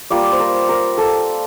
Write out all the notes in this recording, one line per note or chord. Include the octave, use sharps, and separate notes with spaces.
G3 A#3 F4 D5
C5
A#4
A#4
A4